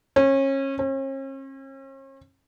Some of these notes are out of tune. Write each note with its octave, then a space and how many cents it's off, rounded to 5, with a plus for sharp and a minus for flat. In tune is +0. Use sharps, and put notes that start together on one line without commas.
C#4 -30
C#4 -45